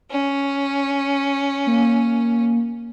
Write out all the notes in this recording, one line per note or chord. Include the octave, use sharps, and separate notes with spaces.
C#4
A#3